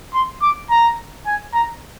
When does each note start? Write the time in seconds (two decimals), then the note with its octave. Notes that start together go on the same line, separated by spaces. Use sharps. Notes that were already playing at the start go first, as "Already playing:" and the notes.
0.14 C6
0.42 D6
0.71 A#5
1.27 G#5
1.54 A#5